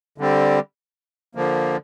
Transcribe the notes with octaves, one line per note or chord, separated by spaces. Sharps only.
D3 G3 C4
D3 F3 A#3